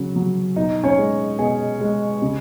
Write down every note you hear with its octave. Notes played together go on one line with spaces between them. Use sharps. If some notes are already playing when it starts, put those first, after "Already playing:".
Already playing: C#3 F#3
F#3
B2 D#4 D#5
C#4 C#5
G#3
B2 G#4
G#3
C#3